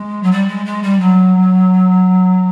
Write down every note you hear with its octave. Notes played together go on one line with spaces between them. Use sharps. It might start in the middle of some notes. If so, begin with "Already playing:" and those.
Already playing: G#3
F#3
G3
G#3
G#3
G3
F#3